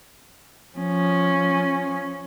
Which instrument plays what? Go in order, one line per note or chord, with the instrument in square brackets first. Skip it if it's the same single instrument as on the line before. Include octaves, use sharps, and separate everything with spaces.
[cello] F3 C#4